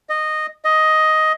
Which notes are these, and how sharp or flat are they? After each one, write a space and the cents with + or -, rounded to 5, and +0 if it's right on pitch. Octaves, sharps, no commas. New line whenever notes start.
D#5 -10
D#5 +10